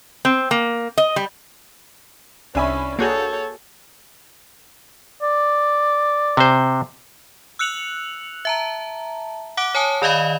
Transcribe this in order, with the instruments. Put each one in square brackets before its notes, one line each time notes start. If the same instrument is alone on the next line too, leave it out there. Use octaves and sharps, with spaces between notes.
[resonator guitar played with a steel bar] C4
A#3
D#5
G3
[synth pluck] C2 E5 C#6 [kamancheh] C#4 [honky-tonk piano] D4 G#5 B5
[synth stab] A#3 F#4 G#4 [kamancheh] A4 C#5 [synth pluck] G6
[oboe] D5
[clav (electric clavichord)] C3 C5
[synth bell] E6 F#6 C#7 F7 F#7
E5 A5 A#5
F#5 D6 F#6 D7
C#5 G#5 A5 D#6
D#3 D5 D#5 F5 B5